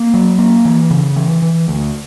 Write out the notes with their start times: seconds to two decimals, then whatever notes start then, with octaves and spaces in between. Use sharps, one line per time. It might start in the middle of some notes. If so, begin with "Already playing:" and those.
Already playing: A#3
0.14 F#3
0.39 A#3
0.65 E3
0.91 C#3
1.16 E3
1.42 E3
1.68 D2